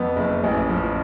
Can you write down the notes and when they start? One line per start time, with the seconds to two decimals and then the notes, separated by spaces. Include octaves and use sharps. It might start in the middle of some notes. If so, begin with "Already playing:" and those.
Already playing: F2 B3
0.16 F#1
0.43 A1
0.69 F3